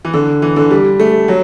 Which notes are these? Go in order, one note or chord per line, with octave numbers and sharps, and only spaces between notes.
E3
D3
E3
D3
G3
A3
F#3